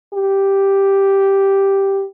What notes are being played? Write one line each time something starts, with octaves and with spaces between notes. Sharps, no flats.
G4